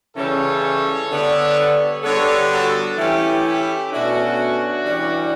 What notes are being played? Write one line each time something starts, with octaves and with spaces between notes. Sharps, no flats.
C#3 E3 G3 C#4 A4 C#5
D3 G3 B3 D4
D3 G3 B3 D4 A4 C#5
F#4 A4
E3 A3 C#4 E4 G4
E4 G4
B2 A3 C#4 D4 F#4
E3 G3 C#4